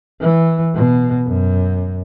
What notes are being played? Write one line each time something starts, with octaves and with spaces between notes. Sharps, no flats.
E3
B2
F#2